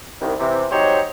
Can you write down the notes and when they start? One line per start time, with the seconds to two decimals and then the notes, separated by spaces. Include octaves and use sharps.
0.22 C2 D#3
0.40 C3 E3
0.71 F#3 D#4 G4 C5 C#5